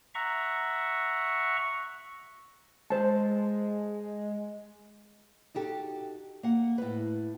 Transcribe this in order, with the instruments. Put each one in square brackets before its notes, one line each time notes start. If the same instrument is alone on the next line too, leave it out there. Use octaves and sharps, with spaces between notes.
[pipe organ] E5 F#5 A#5 C#6
[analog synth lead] G#3 [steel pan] C5 A5
[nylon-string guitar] D#4 F#4 G4 A4
A#3 F#5
A2 B4